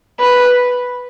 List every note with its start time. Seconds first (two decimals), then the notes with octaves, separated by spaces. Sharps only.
0.20 B4